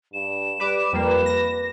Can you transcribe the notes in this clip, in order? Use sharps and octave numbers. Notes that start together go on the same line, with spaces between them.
G2 E7
G3 B4 D6
F2 G3 A#3 B4
A#6